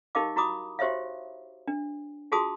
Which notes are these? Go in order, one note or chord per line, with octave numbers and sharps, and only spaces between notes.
D#4 G4 A#4 D#5 F5 D6
E4 F#4 A#5 B5 D6 D#6
F#4 G4 C5 C#5 E5 F5
D4
F4 F#4 G#4 A5 C6 D#6